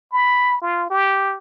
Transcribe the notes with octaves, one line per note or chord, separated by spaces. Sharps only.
B5
F4
G4